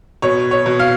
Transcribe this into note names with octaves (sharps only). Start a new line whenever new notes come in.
B2 C#5
C#5
B2
F5